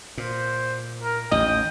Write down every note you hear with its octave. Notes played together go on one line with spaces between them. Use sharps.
A#2 C5
A#4
A1 D#2 D#5 G5